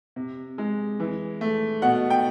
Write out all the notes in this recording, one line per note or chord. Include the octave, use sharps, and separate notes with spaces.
C3
G#3
E3
A3
B2 F#5
G5